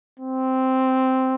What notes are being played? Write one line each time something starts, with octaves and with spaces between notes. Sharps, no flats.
C4